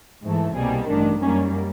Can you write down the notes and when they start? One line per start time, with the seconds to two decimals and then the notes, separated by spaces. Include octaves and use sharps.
0.23 G#2 E3 A3
0.55 C2 B2 G3 A#3 G#4
0.88 A1 G2 D#3 D4
1.21 F#2 D#3 G3 A#3 C#4